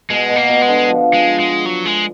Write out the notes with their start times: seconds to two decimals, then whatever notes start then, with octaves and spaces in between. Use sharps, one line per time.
0.10 B2 G#3
0.29 B2
0.36 A#3
0.49 B2
0.62 G#3
0.68 D3
0.88 F3
1.14 G#3
1.39 G#3
1.66 F#3
1.85 G#3